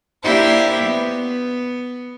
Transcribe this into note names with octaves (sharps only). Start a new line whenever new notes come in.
A#3 D4 E4 G4 C5 E5
B3